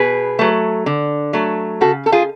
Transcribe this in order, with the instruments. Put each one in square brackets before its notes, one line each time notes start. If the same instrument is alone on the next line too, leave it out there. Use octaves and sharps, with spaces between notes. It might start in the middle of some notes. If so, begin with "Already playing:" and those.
Already playing: [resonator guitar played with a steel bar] B2 G#4 B4
F#3 A3
D3
F#3 A3
C#3 F#4 A4
A4
F4 G#4